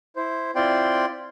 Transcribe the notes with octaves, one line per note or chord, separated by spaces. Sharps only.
E4 C5
C4 E4 F4 D5 G5 C6